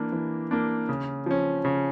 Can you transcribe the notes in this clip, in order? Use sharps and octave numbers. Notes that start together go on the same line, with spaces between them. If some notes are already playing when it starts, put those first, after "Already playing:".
Already playing: E3 A#3 D4
E3
A#3 D4
C#3
F3 C#4
C#3